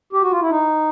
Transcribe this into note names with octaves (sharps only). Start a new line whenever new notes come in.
G4
F#4
F4
E4
D#4